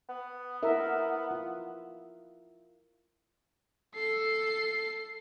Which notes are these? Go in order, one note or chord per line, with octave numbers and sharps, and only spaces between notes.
B3
E4 A#4 E5
F4
A4 C7